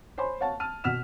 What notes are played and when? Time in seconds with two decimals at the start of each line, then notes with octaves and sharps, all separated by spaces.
0.18 C5 C#5 G#5 B5 C6
0.41 C#5 F5 F#5 A5
0.60 A5 F6 D#7
0.84 B2 F#5 F6 B6 E7